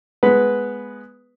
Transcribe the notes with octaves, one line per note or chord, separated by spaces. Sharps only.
G#3 B3 B4